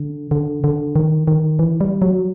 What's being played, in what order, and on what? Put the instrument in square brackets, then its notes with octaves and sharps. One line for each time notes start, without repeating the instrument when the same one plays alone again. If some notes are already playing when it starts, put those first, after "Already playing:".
Already playing: [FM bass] D3
D3
D3
D#3
D#3
E3
G3
F#3